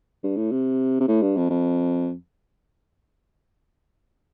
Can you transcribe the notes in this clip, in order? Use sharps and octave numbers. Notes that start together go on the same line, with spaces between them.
G2
A2
C3
C3
A2
G2
F2
F2